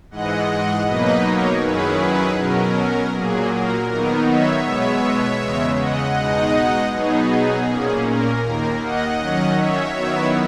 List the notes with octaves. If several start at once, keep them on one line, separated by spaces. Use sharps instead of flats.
G#2 E3 G#3 D#5 F#5
B2 F#3 A#3 D#4 B4 D#5
A#4 C#5
F#2 D#3 F#3 C#4 E4 G#4 B4
B2 F#3 C#4 A#4
A#2 F#3 A#3 G#4
A#4
D#3 F#3 B3 D#4
C#5 E5
B2 G#3 B3
E2 C#3 G#3
D#5 F#5
B2 G#3 D#4
B2 F#3 B3 D#4 G#4
A#2 A#3 C#4
A#4
D#2 D#3 A#3
D#5 F#5
D#3 F#3 C#4
C#5 E5
D#3 F#3 B3 E4